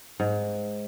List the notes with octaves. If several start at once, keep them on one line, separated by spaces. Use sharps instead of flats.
G#2